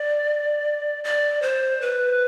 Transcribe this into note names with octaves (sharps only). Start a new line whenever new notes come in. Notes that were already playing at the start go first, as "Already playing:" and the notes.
Already playing: D5
D5
C5
B4